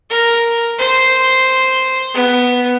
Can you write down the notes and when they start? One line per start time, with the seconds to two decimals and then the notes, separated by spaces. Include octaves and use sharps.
0.10 A#4
0.79 C5
2.14 B3